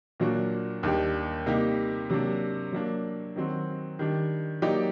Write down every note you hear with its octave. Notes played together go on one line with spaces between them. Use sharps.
A#2 F#3 A#3 D4 F#4
D#2 D#3 G3 D4 G4
C3 G3 A#3 D#4 G4
C3 F#3 A#3 D4
F#3 A#3 D4
D#3 F#3 C4 F#4
D#3 G3 D4
F#3 A#3 D#4 G4 D5